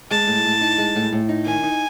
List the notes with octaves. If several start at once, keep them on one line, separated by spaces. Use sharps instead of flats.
G#3 A5
A2
A2
D#4
G#3
A2
A2
D#4
D#3 G#5
D#4